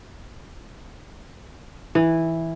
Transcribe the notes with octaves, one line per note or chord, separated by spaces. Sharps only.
E3